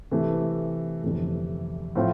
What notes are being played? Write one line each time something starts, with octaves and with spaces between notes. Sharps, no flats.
C3 E3 A3
G1 F2 C3 E3 A3
A2 F3 C4 F4